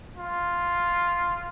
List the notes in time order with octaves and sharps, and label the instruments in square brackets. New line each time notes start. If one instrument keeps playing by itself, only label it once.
[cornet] F4